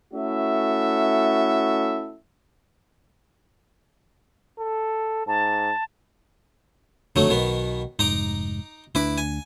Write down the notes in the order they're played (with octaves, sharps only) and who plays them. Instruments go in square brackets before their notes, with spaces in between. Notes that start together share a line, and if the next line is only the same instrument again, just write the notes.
[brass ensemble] A3 C#4 E4 F#4 A4 E5
[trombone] A4
[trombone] G#2 [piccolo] A5
[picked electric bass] F#1 F2 D3 [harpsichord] F#3 A3 D#4
[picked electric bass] B1 [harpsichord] B2 D#3 B3
[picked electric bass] F1 G#2 [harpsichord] D#4 A#5 D6
[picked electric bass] D2 D4 [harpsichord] E4 B4 D6
[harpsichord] G#5